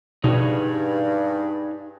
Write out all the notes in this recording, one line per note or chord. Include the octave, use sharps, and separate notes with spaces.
G2 B2 D#4 G#4 C#5